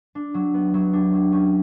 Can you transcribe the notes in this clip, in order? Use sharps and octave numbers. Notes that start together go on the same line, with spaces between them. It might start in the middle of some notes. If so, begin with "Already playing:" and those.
D4
F#3
B3
F#3
D4
F#3
C#4